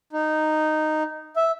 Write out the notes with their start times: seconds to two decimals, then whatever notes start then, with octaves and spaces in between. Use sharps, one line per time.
0.13 D#4
1.36 E5